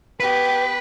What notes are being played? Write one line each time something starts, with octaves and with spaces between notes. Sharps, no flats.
B3 G4 B4